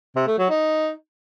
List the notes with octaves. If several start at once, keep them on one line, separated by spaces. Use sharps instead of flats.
C3
A3
F#3
D#4